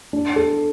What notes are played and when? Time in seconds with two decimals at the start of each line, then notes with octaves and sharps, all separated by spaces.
0.13 D4
0.36 A4